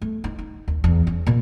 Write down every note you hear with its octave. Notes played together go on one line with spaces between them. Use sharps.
A3
D#4
D#4
D#2
E2
C#4
A#2